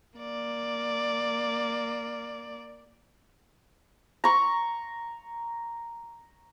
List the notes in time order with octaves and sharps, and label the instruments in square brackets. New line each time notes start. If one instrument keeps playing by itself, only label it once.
[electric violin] A#3 D5
[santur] A#5 C#6